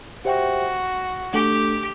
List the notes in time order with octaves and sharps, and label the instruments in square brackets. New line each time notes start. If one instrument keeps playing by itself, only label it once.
[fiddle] F#4 [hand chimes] G4 C5 E5 G5
[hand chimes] A3 D4 A4 [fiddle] G4